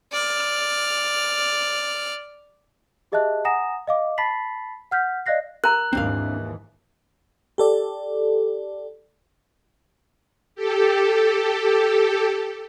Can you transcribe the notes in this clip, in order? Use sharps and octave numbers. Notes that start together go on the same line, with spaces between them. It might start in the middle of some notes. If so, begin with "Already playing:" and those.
D5 F6
G4 G#4 D#5 E5 A5 F#6
F#5 G#5 A#5 D#6 A#6 E7
D#5 F5 D6
A5 B5 A6 B6 C7 F#7
F#5 F6 G6 B6
D5 D#5 F5 F#6 A#6 C7
A#4 A#5 F#6
D#2 G#2 E3 C4 D4 F5
G4 A4 D5
G4 A4